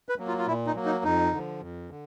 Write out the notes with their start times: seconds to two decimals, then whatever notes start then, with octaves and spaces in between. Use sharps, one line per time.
0.09 B4
0.18 F#3 A#3
0.27 F4
0.38 F4
0.47 A#2 E4
0.66 D#4
0.75 F#3 A#3
0.85 D#4
1.04 F2 D#4
1.32 D3 F3
1.62 F2
1.90 D3